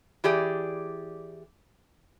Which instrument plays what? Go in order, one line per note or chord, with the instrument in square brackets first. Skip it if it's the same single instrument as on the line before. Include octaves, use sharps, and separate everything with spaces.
[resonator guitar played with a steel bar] E3 G4 G#4 D5